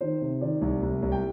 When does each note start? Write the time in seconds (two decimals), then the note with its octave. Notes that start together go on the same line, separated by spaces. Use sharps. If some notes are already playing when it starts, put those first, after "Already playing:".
0.01 D#3 C5
0.21 C3
0.41 D#3 D5
0.61 C2
0.82 C2
1.02 C2
1.12 G5